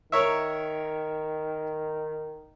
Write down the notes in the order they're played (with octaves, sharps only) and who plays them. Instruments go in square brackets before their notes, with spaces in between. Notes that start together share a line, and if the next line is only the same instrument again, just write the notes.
[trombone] D#3 [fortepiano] A#4 C#5 E5